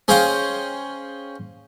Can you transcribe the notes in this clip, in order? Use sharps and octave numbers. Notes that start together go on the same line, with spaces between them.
C#4 G#4 C5 D#5 F5 G5